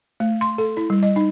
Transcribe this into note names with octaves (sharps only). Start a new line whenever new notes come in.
A3
C6
A4
E4
G3
D#5
D#4